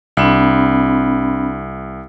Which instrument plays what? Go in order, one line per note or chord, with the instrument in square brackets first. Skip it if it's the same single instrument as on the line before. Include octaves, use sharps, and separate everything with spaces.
[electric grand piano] C2 [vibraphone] C4 D4 B5